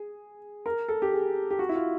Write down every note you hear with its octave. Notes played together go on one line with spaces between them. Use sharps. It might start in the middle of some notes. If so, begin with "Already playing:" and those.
Already playing: G#4
A#4
A4
G4
G#4
G4
F#4
E4
F4